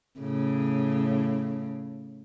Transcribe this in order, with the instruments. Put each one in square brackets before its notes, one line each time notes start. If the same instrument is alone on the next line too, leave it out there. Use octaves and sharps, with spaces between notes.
[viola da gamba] A2 C#3